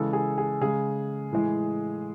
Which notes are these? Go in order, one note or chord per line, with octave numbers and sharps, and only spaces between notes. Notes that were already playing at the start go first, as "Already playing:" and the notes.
Already playing: C#3 E3 G#3 A4
G#4
G#4
C#3 G#3 G#4
A2 E3 G#3